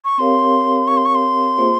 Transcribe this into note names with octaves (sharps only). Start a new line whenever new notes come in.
C#6
C4 G4 A#4 C#5 F5 C6
C#6
C6
C#6
C6
A#3 F4 G#4 C5 E5